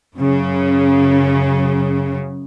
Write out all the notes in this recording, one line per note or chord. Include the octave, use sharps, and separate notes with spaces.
F#2 C#3